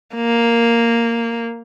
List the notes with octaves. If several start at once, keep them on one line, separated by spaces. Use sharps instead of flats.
A#3